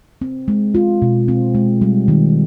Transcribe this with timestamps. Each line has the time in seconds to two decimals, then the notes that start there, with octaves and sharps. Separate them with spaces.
0.21 C4
0.48 G#3
0.75 F4
1.02 B2
1.28 C4
1.55 G#3
1.82 G3
2.08 D#3